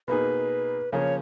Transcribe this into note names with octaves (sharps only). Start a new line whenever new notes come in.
B2 A#3 D#4 G#4 B4
C#3 F3 A#3 C#5